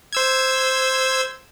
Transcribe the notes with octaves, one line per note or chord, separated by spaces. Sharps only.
C5 E6 G#6